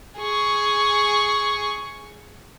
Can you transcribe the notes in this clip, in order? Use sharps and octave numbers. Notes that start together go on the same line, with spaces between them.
G#4 C#6